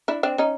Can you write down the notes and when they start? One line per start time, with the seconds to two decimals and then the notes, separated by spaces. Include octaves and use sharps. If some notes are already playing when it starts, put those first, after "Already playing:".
0.08 D4 E4
0.23 C4 D4
0.38 C#4 D#4